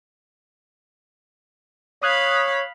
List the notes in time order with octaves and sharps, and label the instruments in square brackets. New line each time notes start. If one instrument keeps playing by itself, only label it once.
[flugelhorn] C#5 [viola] F5 B5 [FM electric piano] D#6 F#6 G#6